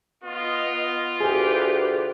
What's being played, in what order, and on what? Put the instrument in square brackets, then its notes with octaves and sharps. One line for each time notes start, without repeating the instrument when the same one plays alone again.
[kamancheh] B3 D#5 [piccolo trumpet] F4
[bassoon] D2 [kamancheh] G4 B4 [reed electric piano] G#4